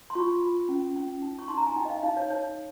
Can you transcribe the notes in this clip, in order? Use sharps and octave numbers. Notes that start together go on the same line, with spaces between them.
C6
F4 C#6
F4
C#4
C#4
D#4
C#6
D#4 C6
A#5
G#5
D#4 G5
D#5
F5
D#4 F5
C#5
D#4 C#5